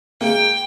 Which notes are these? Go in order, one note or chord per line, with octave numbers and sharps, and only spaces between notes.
G#3 A#3 G5